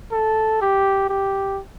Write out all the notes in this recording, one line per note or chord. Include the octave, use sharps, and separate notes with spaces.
A4
G4
G4